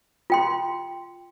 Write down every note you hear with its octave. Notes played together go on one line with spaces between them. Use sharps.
F4 G5 C6